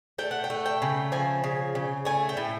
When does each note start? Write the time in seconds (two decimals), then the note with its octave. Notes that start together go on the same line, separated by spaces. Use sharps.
0.18 A3 G5
0.31 F#5
0.44 G5
0.50 A3
0.66 G5
0.82 C#3
1.12 F3 G#5
1.44 C#3
1.75 C#3
2.05 A3 G#5
2.29 G5
2.37 A2